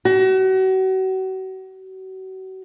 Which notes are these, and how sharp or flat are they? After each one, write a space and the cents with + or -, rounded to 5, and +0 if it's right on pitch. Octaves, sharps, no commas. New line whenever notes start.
F#4 +35